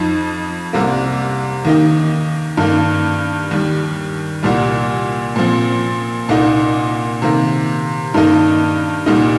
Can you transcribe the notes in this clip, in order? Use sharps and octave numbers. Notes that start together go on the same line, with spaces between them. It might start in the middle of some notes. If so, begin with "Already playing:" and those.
Already playing: F2 F3 D#4
C2 C3 G3 A#3
D#2 D#3 A#3 D#4
G2 D#3 A#3
D#2 D#3 G3
C2 A#2 G3
A#2 F3 C4
C2 A#2 A#3 D#4
C3 D#3 A#3
G2 D#3 A#3 D#4
C2 A#2 G3 D#4